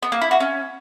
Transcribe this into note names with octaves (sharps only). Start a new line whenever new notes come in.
B3
A#3
E4
F#4
C#4